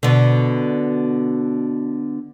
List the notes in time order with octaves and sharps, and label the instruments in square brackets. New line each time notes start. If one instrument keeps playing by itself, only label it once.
[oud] B2 D3